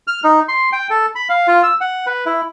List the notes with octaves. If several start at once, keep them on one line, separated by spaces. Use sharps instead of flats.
F6
D#4
C6
G5
A4
B5
F5
F4
E6
F#5
B4
E4